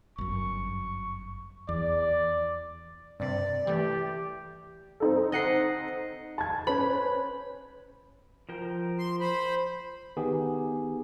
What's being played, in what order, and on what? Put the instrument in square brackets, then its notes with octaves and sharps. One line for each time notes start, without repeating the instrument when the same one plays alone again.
[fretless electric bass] G1 F#2 [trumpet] C#6
[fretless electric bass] E2 [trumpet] D5
[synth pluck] G2 C3 [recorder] D5
[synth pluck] E3 A3 [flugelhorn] G4
[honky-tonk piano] C4 D#4 A4
[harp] D#5 F#5 C7
[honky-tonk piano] A5 G#6
[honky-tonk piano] C#4 B4 C5 [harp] B5
[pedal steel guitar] F3 A#4 G5
[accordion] C6
C5 B5
[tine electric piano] D#3 B3 D#4 G4 G#4